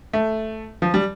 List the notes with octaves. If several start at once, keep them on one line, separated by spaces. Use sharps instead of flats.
A3
F3
G3